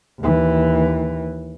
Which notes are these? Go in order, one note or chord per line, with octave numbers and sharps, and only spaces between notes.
D#2 E3